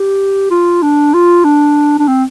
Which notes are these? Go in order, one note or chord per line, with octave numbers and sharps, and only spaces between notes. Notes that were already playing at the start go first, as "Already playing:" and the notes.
Already playing: G4
F4
D4
F4
D4
D4
C4